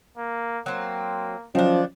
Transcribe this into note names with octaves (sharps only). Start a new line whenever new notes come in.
A#3
F#3 A#3 C4
D#3 F3 F#3 C#4 D4